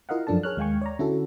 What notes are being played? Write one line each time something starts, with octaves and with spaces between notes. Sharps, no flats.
E4 F4 A#4 D#5 F5 F#5
F#2 F3 D4 A4 A5
G#4 A#4 C#5 F6 F#6
D#2 G#3 F5 G5 G#5 C#6
C#5 D5 A#5
D3 C#4 E4 F#4 A4